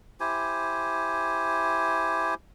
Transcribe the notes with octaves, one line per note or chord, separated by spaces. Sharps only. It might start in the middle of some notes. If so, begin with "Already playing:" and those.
E4 G4 C5 G#5